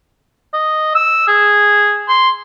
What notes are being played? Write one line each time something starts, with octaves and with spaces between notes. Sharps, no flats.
D#5
E6
G#4
C6